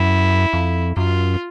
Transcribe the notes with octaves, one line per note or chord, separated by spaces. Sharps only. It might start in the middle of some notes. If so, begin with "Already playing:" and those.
Already playing: F#2 E4
F2
F#2 F4